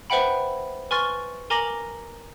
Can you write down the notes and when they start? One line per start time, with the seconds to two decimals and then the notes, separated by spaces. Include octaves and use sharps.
0.10 B4 C5 E5 F#5 G5 B5
0.91 B4 G#5 C6 C#6 F6 A6
1.50 A#4 G#5 A#5 D6 A#6 F#7